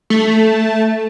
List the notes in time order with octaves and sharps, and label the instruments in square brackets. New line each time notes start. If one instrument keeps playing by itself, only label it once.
[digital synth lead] A3